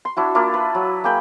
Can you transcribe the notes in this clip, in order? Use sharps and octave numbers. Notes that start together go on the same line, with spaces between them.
C6
D4 E4 F#4
A#3 D4 E4 F4
B4
F#3
A#3 G#4 G5 B5